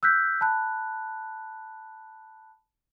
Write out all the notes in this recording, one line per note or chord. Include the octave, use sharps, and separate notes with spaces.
E6 F#6 G6 B6
A5 B5 F#6